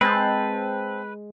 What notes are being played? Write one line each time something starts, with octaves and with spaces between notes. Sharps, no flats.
G#3 C4 B4 A5